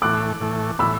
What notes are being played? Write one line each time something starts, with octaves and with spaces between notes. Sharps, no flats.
A2 E3 A3 D6 F#6
A2 E3 A3
A2 E3 B5 E6